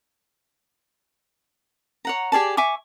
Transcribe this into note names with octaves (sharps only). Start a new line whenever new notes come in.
C#5 F#5 A#5
G4 G#4 D5 A5
E5 G#5 C#6 D6